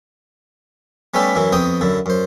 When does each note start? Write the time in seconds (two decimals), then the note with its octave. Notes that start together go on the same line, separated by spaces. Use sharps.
1.14 G3 A3 B3 C#4 G4 E5
1.35 F#2 E3 F#3 E4
1.52 F2 B3 C4 F#4 G5 D#6
1.81 F#2 D3 E4
2.06 F#2 C5